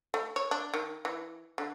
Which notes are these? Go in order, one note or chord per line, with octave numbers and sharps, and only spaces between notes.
A3
C#5
D4
D#3
E3
D3